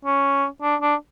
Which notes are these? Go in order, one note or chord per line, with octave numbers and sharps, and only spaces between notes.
C#4
D4
D4